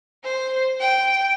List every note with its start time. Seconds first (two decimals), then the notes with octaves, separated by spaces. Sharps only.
0.24 C5
0.80 G5